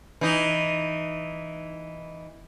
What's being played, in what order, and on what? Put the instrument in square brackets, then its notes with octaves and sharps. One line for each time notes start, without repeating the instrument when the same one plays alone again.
[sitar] E3 D#4